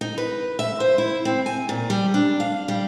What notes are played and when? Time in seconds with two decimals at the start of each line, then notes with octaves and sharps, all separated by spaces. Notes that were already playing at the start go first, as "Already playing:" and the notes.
0.01 D#4
0.18 B4
0.59 E5
0.80 C5
0.98 E4
1.25 C4
1.46 G#5
1.69 A#2
1.90 G3
2.14 D4
2.40 F5
2.68 G3